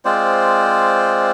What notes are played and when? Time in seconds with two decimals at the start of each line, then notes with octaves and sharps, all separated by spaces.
0.05 G#3 C4 F4 C5 D5